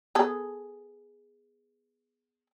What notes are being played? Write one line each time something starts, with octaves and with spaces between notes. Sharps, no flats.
B3 G#4 A4